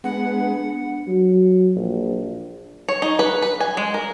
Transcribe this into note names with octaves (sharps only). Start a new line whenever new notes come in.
G#3 B3 D4 F#5
F#3
A#1
C#5
D#4
B4
B4
G#5
G#3
A#4